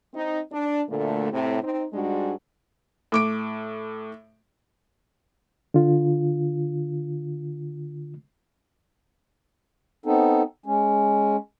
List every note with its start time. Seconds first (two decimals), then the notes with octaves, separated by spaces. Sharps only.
0.14 C4 D#4
0.52 D4
0.89 D2 A#2 D3 A3
1.32 A2 C3
1.63 C4 D#4
1.93 G#2 G3 G#3 D4 F#4
3.12 A2 D6 D7
5.74 D3 F4
10.06 B3 C4 D#4 A4
10.66 G#3 C#4